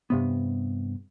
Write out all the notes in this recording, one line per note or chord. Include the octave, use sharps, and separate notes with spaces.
G2 C3 B3